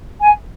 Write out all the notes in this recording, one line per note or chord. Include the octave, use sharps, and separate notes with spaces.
G#5